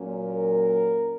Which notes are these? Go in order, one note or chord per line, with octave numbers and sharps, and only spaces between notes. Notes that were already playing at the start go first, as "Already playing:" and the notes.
Already playing: A#2 F#3 C#4
A#4